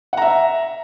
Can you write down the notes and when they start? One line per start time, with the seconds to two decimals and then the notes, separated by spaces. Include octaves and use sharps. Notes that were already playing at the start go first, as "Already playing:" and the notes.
0.13 F#5
0.17 A#5
0.22 E5